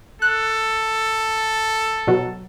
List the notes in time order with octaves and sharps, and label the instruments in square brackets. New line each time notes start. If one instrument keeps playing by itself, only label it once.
[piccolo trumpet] A4 [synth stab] F#6
[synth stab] B2 F#3